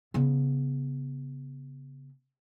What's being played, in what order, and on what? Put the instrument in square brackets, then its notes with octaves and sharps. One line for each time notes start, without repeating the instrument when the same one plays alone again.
[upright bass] C#3 B3